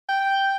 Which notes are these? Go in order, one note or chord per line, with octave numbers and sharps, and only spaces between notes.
G5